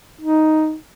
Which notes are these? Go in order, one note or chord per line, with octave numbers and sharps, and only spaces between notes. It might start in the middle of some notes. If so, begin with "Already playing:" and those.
D#4